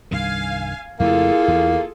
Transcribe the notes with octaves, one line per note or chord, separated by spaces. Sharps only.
C2 G2 D#3 F5 G#5
F2 C#3 A3 A#3 E4 F4 G#4 A4
E2